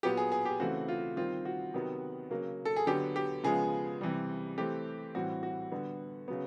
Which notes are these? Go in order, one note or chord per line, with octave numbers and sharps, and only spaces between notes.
A#2 F#3 B3 G4
G#4
G#4
G4
C#3 E3 A3 C4 F#4
F4
D#3 G3 C4 F4
F#4
C3 D#3 F#3 B3
C#3 F#3 A#3
A4
G#4
D3 F#3 B3 G4
G4
C#3 F3 G#3 B3 G#4
C3 E3 G3
E3 A3 C4 G4
A2 E3 G3 C4 F#4
F#4
D3 G3 B3
C#3 F#3 B3